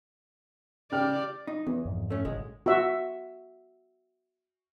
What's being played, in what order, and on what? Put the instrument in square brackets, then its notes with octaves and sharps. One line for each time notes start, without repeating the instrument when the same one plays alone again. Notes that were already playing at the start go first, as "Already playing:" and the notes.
[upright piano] C#3 G5 F6 [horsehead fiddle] G4 D5
[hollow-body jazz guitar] D#4
[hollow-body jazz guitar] E2 [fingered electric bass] B3
[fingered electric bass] F2 G#2
[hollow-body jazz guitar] A3 C#4
[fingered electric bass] G#1 A#2 D3 [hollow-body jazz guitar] G#3
[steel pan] F#4 E5